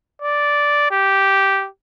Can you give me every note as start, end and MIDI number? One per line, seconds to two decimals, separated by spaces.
0.22 0.90 74
0.91 1.67 67